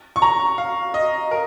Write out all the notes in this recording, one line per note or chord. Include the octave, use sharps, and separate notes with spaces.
C#6
A#5
F5
D#5
A#4